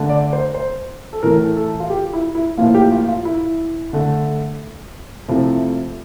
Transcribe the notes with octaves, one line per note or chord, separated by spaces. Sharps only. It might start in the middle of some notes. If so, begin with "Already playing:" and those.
Already playing: D3 A3
D5
C5
C5
A4
A2 E3 A3 A#4
A4
F4
G4
E4
E4
A2 F3 A#3 F4
G4
F4
F4
E4
D3 A3
C3 F3 A3 E4